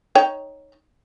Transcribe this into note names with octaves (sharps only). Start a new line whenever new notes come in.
D#4 C#5 G5